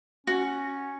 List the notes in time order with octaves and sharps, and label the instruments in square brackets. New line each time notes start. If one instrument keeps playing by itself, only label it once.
[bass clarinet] C#4 [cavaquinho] F#4